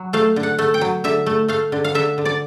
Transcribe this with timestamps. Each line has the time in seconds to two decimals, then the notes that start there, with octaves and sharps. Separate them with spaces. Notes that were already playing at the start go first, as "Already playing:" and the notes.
Already playing: F#3
0.13 A3 F5
0.36 D3
0.43 F#5
0.59 A3
0.74 G5
0.81 F#3
1.04 D3 E5
1.26 A3
1.48 A3 F5
1.72 D3
1.84 F5
1.95 D3 E5
2.18 D3
2.25 D5